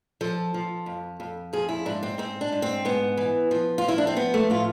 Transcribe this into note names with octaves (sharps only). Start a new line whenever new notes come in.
F3 A4
F3
F2
F2
F3 G#4
E4
G#2 D4
C4
G#2 C4
D4
G#2
C4
G#2 B3
E3
F3
F4
F3 E4
D4
C4
F3 B3
A3
A2 F4